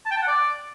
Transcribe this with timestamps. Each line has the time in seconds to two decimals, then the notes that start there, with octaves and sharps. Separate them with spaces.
0.06 A5
0.11 G5
0.17 A5
0.22 F#5
0.28 D5